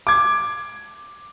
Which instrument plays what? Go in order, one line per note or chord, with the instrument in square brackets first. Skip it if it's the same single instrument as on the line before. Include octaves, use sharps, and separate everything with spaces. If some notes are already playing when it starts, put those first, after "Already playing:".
[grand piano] D6 G#6